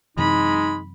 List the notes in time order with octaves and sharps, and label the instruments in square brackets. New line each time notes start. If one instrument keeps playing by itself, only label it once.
[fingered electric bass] F#2 C3 E3 [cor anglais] G#3 [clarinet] D#4 [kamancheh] B5